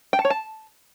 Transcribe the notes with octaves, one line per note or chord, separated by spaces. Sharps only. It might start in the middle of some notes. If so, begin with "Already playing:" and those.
G5
A5
C#5
A5